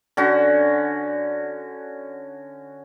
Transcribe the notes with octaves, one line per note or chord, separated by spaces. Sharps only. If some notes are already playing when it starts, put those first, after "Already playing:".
D3 C#4 F#4